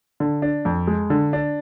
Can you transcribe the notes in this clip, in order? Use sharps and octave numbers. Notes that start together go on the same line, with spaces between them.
D3
D4
F2
G#3
D3
D4